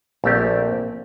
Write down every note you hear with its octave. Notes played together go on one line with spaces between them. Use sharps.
A#1 A3 A#3 C4 G4